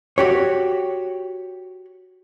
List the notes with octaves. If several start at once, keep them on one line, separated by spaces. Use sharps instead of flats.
F#4 G4 C#5